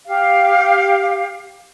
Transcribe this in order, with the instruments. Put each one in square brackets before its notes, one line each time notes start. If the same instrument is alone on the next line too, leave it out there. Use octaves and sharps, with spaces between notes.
[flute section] G4 F5